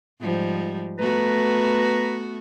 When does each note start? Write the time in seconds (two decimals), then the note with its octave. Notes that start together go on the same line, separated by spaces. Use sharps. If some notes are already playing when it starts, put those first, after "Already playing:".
0.22 G#2 F3 G3
0.99 A3 B3 F#4 B4 A#5